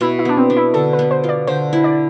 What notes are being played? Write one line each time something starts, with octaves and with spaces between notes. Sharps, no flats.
B2 E4
E4
B3 D4
C4
D4
E4
D3 A4
B4
B3
C5
F4
D5
D3 C5
E4
D5